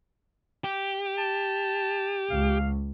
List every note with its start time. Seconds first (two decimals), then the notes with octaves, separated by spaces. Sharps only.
0.64 G4
1.18 A5
2.30 C#2 F5